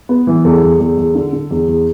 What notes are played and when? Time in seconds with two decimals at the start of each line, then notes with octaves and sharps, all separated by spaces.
0.09 B3
0.27 E3
0.44 E2 A4
0.63 E2
0.79 E2
0.97 E2
1.15 D3
1.33 D3
1.50 E2
1.68 E2